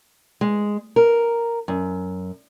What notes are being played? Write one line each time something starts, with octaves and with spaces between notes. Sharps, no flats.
G#3
A#4
F#2